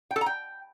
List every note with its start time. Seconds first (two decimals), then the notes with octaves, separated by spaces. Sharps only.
0.11 G5
0.16 A4
0.21 A#5
0.26 G5